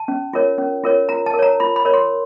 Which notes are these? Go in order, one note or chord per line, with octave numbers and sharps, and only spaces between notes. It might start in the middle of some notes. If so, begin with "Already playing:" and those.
Already playing: A5
C#4
F4 A#4 C#5
C#4
F4 A#4 C#5
F4 A#5
A5
A#4
C#5 A#5
F4 B5
B5
A#4 C#5
C6